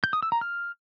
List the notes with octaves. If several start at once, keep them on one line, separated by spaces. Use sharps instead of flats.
G6
D#6
E6
A#5
F6